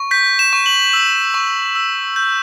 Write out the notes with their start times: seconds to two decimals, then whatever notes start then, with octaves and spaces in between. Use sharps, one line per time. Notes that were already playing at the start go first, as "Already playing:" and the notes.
Already playing: C#6
0.11 G6 B6
0.39 E7
0.53 C#6
0.66 F#7
0.93 E6
1.34 C#6
1.75 E6
2.16 G6